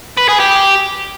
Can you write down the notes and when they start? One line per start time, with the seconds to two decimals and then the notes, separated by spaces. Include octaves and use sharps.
0.18 B4
0.29 G#4
0.40 G4